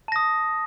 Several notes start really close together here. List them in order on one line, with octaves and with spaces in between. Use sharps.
A5 A#6 D#6